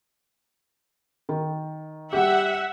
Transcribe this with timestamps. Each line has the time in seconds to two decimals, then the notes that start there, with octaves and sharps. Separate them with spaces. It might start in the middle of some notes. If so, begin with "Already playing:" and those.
1.29 D#3
2.13 G3 G4 E5 F#5